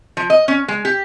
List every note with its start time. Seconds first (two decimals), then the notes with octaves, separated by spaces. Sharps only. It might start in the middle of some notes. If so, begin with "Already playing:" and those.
0.17 F3
0.30 D#5
0.48 C#4
0.68 G#3
0.85 G4